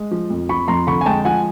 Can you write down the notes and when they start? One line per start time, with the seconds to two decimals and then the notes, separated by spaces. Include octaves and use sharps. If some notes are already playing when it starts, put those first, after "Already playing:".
Already playing: G#3
0.11 F3
0.30 F2
0.49 F3 B5 C#6
0.68 F2 A#5 C6
0.87 D3 B5 C#6
1.01 G#5
1.06 G#3 G5 A5
1.25 F3 F#5 G#5